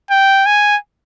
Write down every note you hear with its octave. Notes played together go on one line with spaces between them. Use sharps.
G5
G#5